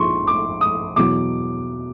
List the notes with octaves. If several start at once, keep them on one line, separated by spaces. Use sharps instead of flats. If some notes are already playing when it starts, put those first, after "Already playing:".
Already playing: A#1 G#2 F3 C6 C#6
D6
D#6
E2 B2 F#3 D6